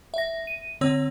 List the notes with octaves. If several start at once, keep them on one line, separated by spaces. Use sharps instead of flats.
E5 A#6
D#7
D3 C4 C#5 E6